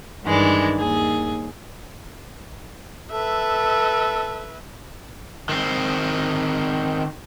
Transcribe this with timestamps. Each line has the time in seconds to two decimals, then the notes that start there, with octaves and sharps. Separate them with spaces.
0.24 G2 D#3 E3 G#3 D4
0.77 D#2 G#4
3.12 A4 B4 E5
5.49 D#3 C4